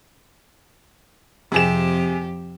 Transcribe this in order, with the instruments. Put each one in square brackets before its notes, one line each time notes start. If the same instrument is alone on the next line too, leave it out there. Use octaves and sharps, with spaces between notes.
[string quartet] F2 G4 [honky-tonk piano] C3 G#4 E7